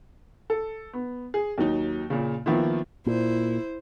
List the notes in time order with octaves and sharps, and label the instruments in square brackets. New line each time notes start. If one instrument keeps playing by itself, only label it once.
[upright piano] A4
B3
G#4
D#2 F#3 D#4
A#2 C#3
D#3 F3 A#3 B3 E4
[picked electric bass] A#2 [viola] E4 C5